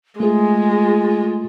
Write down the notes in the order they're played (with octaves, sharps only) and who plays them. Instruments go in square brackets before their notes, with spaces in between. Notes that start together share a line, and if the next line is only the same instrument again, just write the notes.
[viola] G#3 [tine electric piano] A3 G#4 [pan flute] F4